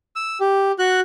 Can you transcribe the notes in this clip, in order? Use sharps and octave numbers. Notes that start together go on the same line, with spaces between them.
E6
G4
F#4 F#6